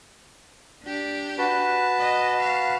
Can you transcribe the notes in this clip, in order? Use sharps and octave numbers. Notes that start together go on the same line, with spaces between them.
D4 G4
F#4 B4 A5
D#5
F5